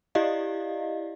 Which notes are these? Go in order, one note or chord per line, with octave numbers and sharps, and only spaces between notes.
E4 G4 D5 D#5 F5